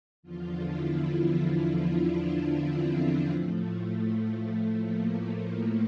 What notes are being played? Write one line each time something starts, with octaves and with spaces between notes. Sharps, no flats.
E2 D3 F3 F4
E4
E4
E4
D4
C4
A2 F3 A3
A#3
A3